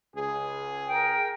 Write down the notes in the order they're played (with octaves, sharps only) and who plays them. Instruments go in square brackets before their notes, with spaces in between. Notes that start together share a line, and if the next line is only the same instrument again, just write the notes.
[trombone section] C#2 G#4
[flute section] A#4 G5